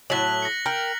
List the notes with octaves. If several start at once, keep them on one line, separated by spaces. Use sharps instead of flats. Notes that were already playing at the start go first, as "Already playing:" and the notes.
A2 F#3 F#6 B6 F#7
A#6 C#7
A#4 G5 F6 F#7